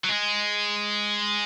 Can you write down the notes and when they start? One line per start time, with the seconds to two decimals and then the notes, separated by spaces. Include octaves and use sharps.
0.05 F#3
0.09 G#3